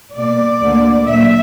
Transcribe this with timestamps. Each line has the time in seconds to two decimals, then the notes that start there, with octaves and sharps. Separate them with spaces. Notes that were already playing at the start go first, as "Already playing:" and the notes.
0.16 B2 A#3 D5
0.62 D2 D3 A#3
1.07 A#2 F#3 A#3 E5